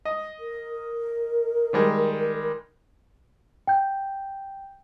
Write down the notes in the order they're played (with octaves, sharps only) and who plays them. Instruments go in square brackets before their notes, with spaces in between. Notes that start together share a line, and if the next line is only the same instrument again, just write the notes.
[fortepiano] D#5
[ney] A#4
[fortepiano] D#3 G3 G#3
[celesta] G5 G6